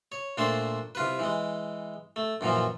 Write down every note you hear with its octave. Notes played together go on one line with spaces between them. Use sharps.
C#5
A#2 A3 D4 C5
C2 F4 B4
E3 G#3
A3
F#2 A#2 E3 F3